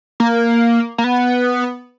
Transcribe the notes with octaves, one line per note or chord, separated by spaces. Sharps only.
A#3
A#3
B3